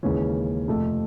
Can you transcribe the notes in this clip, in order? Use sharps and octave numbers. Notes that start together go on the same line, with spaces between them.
D#2 C#3 E3 G#3 C#4
F2 C3 F3 A3